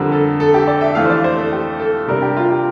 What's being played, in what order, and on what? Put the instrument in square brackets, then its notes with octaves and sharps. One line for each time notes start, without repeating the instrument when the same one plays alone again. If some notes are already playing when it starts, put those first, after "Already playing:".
Already playing: [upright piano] F2 D3 G3 A#4
A4
A4
G4
D5
E5
F2 E3 A3 F5
C5
D5
C5
A4
G4
A4
C3 G3 D4 A#4
G4
F4
G4